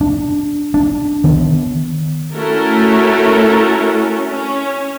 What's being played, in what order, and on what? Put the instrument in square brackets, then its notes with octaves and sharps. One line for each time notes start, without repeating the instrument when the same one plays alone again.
[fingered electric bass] D4
D4
D#3 B3
[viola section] A3 C#4 E4 F#4 A4 A#4
C#4